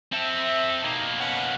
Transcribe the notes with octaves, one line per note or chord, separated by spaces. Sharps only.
C4 A4 E5
B2 A#3 D#4 G4
C#4 B4 F#5